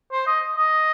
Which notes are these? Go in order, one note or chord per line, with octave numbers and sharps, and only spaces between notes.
C5
D#5
D#5